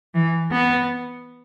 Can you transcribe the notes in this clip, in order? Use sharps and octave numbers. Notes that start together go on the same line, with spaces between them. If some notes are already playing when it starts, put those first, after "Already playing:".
E3
B3